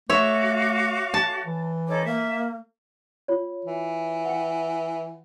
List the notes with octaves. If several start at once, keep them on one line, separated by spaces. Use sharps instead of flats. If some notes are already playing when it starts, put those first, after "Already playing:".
A3 F#4 C#5 E5 F5 D6
A5
E3
D#4 A4 C#5 D6
A#3 E5
F4 C#5
E3
F#5 G5